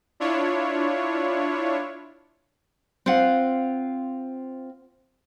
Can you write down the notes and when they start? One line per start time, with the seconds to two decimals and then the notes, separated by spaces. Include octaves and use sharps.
0.20 D4 E4 F4 C#5
3.06 C4 F4 F5 F#5